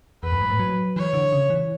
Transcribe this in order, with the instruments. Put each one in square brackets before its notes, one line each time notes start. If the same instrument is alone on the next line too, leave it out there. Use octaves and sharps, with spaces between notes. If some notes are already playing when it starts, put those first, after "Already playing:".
[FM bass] E2 [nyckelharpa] B4
[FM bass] F#2
G#2
A2
F#3
[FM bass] E3 [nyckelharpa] C#5
[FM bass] D3
C#3
E3